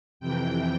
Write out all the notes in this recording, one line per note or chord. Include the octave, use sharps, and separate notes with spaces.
F2 C3 E3 G5